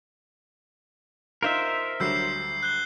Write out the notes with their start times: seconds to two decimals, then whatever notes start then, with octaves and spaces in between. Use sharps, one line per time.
1.43 D#4 F4 A#4 C5 E5 C6
2.00 D2 F#3 G3 E6 G6 C7
2.63 F#6 G6 G7